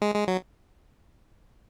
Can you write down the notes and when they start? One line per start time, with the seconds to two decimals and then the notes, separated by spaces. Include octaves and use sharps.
0.02 G#3
0.15 G#3
0.28 F#3